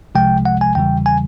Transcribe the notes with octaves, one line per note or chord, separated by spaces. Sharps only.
C2 C3 F3 G#3 G5
F#5
G#5
E2 C#3 E3 G3 G5
G#5